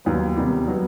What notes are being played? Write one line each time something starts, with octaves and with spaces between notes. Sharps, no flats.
D#2 D#3 F#3 B3
E2 C3 D#3 G3 D#4
F#3 B3 D#4